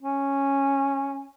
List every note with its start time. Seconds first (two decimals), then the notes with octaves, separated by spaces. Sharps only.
0.01 C#4